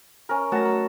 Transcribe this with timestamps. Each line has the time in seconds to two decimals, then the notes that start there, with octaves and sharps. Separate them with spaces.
0.29 C#4 A#4
0.52 F#3 A3 A#4 F#5 A5 A#6
0.66 A#5